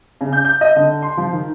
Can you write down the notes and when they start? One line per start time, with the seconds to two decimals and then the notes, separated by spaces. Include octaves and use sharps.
0.21 C#3
0.33 G6
0.45 G6
0.61 D#5
0.76 D3
1.02 C6
1.17 F3
1.33 D#3